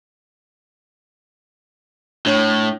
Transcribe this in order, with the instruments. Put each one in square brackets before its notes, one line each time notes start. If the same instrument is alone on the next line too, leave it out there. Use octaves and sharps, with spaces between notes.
[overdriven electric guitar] A2 [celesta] D4 C#5 F#7